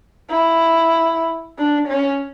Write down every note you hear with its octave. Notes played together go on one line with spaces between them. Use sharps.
E4
D4
C#4